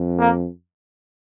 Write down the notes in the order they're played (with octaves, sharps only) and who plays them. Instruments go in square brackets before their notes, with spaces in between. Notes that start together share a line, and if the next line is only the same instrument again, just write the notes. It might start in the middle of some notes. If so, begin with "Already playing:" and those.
Already playing: [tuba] F2
[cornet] A#3